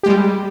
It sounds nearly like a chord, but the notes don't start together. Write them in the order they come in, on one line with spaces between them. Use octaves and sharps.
G4 G#3 G3